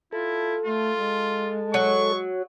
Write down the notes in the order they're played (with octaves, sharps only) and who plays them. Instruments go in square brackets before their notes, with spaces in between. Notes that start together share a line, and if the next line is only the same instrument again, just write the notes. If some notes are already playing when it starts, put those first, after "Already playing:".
[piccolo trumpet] E4 [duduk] F4 [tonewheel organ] A4
[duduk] A3 [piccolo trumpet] F4
[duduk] G#3
[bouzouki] F#3 [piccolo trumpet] C#6